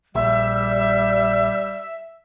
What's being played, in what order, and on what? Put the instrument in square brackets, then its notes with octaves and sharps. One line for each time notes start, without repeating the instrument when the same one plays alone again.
[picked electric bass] A#1 [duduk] G3 [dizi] E5